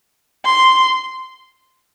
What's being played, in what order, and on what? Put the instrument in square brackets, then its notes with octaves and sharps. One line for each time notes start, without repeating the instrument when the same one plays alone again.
[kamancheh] C6